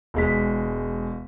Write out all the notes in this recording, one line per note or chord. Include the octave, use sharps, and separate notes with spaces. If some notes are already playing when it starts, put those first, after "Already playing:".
E1 G#3 B6